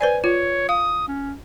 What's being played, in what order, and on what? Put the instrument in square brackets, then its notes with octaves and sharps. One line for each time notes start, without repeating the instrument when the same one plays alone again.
[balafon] B4 C5 D5 [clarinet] G#5
[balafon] F4 [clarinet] C#5
[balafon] F5 [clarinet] D#6
[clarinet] C#4